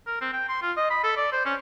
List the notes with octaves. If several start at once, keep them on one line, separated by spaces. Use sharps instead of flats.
A#4
C4
G5
C6
F4
D#5
B5
A4
D5
C5
C#4